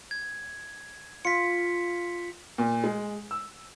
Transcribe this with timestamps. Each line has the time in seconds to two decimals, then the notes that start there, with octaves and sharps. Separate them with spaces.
0.11 G#6
1.25 F4 B6 C#7
2.58 A#2
2.84 G#3
3.31 E6